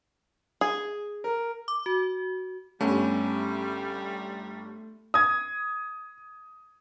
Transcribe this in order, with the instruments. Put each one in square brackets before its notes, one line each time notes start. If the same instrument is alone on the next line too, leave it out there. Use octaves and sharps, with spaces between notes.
[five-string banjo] G#4
[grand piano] A#4
[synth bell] D6
F#4
[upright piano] G1 G2 [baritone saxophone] G3 [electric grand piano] A3 [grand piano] C#4
[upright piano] D#6 G#6